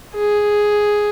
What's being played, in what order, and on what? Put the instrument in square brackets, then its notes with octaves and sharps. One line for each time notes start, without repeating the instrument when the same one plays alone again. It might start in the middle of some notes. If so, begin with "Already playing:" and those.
[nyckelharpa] G#4